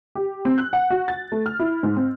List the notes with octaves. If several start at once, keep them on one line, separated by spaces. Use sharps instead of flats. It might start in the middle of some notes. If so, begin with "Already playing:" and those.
G4
C4
F#6
F#5
F#4
A6
A3
F6
E4
G#2
C4